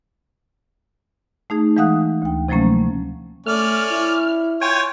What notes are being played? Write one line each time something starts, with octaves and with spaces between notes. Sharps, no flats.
A3 D#4 G#4
E3 G#3 F5 F#5 D#6 F#6
D2 G5
C3 F3 F#3 A3 A#3 C#4
A3 C#4 D5 F6
E4
F4 C#5 G5 G#5